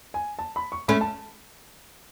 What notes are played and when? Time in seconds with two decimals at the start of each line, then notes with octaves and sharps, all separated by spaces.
0.14 G#5
0.39 A5
0.56 B5
0.72 C#6
0.88 A3 C#4 B5
1.01 A5